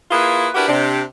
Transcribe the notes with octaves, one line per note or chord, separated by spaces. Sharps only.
A#3 E4 F4 G#4 B4
D4 E4 F#4 G4 A#4 B4
C3 D4